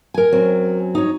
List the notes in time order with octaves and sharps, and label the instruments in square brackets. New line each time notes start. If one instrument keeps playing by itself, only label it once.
[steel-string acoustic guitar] A#4 G#5
[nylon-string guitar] F#2 F#3 C4
[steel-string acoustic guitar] D#4 C#5